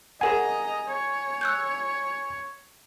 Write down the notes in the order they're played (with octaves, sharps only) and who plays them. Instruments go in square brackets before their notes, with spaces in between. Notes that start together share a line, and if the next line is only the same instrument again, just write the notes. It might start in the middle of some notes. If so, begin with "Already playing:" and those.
[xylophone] G#4 A#4 F#5 [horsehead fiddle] D#5 A#5 [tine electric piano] G#5
[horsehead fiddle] C#5
[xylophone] E6 F#6 G6